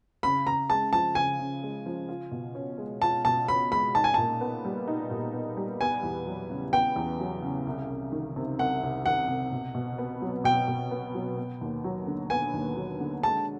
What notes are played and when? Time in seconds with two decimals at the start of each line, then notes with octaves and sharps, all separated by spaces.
0.23 C#3 B5
0.46 C#3 A#5
0.70 G#3 A5
0.93 F3 A5
1.15 C#3 G#5
1.39 C#3
1.63 G#3
1.86 F3
2.09 F4
2.31 B2
2.55 C#4
2.78 G#3
3.02 F4 A5
3.25 B2 A5
3.48 C#4 B5
3.71 G#3 B5
3.95 D#4 A5
4.04 G#5
4.14 A#2 A5
4.41 B3
4.65 G3
4.88 D#4
5.11 A#2
5.33 B3
5.57 G3
5.81 B3 G#5
6.03 E2
6.27 F#3
6.50 C#3
6.73 B3 G5
6.96 E2
7.20 F#3
7.42 C#3
7.67 C2
7.90 C2
8.12 D#3
8.36 C3
8.58 C2 F#5
8.83 C2
9.06 D#3 F#5
9.28 C3
9.52 B2
9.75 B2
9.98 B3
10.22 F#3
10.44 B2 G5
10.68 B2
10.91 B3
11.15 F#3
11.37 B3
11.61 D#2
11.84 F#3
12.07 D3
12.30 B3 G#5
12.54 D#2
12.76 F#3
13.00 D3
13.23 G#3 A5